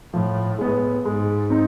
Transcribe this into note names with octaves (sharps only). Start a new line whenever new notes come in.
A2 F3
A2 G#3 B3
G#2 G#3
C4 D#4